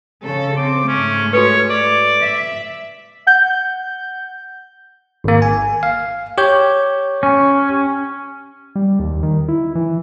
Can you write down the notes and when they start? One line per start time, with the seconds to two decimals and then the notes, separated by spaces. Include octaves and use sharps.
0.24 C#3 A4
0.57 C4 D6
0.88 G#2 A3 C#4
1.33 F#4 A4 B4 C#5
1.70 D5
2.20 E5
3.27 F#5 G6
5.24 G#1 A#3
5.42 G#5
5.83 F5
6.38 G4 C#5 G6
7.23 C#4
8.76 G3
8.99 D#2
9.23 D#3
9.48 E4
9.75 E3